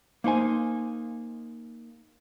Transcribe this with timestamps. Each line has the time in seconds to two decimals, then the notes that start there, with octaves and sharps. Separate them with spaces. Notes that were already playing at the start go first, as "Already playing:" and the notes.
0.24 A#3 D#4 C5 G#5